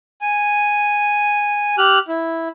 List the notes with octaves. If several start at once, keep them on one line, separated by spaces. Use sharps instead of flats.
G#5
G4 F6 F#6
E4